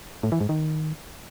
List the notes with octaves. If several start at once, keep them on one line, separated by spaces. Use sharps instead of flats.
A2
E3
G#2
D#3